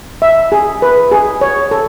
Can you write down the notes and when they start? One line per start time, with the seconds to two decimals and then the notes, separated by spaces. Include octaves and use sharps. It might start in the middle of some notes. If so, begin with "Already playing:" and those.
0.22 E5
0.52 G#4
0.82 B4
1.12 G#4
1.41 C#5
1.71 A4